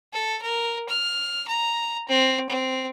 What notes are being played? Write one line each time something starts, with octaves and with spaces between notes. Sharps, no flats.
A4
A#4
F6
A#5
C4
C4